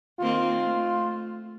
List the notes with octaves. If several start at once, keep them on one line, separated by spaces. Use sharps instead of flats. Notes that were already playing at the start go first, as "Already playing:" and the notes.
D#3 A#3 C4 F4
A3